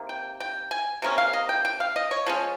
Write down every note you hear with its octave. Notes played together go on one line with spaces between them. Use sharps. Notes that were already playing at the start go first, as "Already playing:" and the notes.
Already playing: C3 D#3 A#3
G5
G5
G#5
C3 D#3 A#3 C#4
F5
D#5
G5
G5
F5
D#5
C#5
F3 G#3 C#4